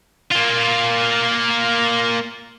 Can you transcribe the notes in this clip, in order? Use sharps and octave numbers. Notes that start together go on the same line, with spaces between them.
A#3 F4